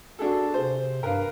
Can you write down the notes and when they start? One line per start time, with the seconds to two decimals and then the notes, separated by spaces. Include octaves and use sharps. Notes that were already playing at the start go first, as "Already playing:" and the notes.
0.19 D4 F#4 G#4 A4
0.54 C3 C5
1.03 G2 A#4 B4 F5